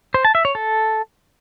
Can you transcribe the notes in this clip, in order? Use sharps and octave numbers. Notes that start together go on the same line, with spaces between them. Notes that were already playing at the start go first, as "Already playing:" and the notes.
C5
A5
E5
C#5
A4